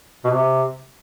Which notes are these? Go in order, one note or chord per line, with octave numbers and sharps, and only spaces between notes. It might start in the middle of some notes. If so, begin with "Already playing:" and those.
B2
C3